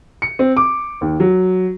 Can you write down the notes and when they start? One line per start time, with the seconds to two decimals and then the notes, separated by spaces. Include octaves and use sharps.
0.22 C#7
0.39 C4
0.57 D6
1.01 D#2
1.20 F#3